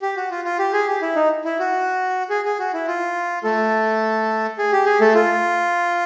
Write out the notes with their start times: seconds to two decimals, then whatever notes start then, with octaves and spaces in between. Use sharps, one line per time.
0.02 G4
0.16 F#4
0.31 F4
0.44 F4
0.59 G4
0.73 G#4
0.87 G4
1.02 E4
1.16 D#4
1.45 E4
1.59 F#4
2.30 G#4
2.45 G#4
2.59 F#4
2.73 E4
2.87 F4
3.44 A3 A4
4.58 G#4
4.72 G4
4.86 G#4
5.00 A3 A4
5.14 F4